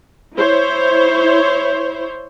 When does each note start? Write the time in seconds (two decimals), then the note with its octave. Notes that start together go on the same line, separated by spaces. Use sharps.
0.36 E4 C5 C#5